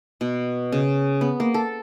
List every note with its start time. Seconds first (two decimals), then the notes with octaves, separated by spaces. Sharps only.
0.21 B2
0.72 C#3
1.21 B3
1.40 A#3
1.54 A4